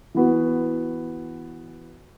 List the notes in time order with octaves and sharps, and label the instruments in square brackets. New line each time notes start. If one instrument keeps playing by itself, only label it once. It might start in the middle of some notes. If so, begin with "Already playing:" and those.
[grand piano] E3 B3 F#4